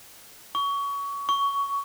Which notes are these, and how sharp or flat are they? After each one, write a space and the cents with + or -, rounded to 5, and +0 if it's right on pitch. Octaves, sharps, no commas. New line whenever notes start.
C#6 +25
C#6 +15